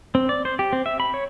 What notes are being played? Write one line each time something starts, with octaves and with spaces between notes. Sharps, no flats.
C4
D5
C5
G4
C4
E5
B5
C#5